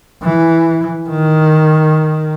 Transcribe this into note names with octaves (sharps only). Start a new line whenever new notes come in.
E3
D#3